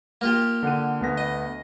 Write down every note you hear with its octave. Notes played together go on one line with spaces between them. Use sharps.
A#3 F4 G4
D3 F#5 D#7
D2 B3 A#6
D#5